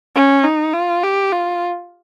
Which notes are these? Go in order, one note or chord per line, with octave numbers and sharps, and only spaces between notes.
C#4
D#4
F4
G4
F4